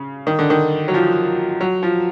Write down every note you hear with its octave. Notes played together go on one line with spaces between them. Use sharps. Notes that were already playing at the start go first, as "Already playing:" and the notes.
Already playing: C#3
D#3
D3
D#3
F#3
F3
F#3
F3